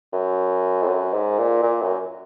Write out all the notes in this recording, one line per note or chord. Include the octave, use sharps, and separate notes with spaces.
F#2
F2
F#2
G#2
A#2
A#2
F#2